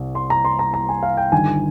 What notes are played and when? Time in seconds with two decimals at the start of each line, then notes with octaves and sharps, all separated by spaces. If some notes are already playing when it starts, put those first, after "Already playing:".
Already playing: C2 C3
0.15 C6
0.30 A#5
0.45 C6
0.59 A#5
0.74 A#5
0.89 G#5
1.03 F5
1.17 G5
1.32 G1 G2 D#3 G#5